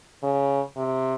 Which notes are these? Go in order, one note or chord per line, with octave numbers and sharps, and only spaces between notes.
C#3
C3